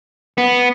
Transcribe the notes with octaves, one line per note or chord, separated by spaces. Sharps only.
B3